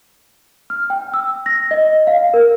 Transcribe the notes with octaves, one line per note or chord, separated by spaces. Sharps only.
F6
G5
E6
A#6
D#5
F5
A#4